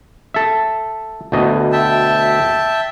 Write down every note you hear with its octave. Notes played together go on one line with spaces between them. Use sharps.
A4 E5
D2 B2 D#5
E5 G5 A5